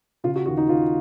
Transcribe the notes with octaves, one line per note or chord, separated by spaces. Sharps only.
C#3 F4
F#4
D#2 F#4
D#4
D#2 F4